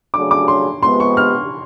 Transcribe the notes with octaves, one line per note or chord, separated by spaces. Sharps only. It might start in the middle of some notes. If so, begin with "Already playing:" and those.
C#3 F#3 A3 D4 D6
D6
C6
C3 F3 G#3 B3 C6
C#6
F6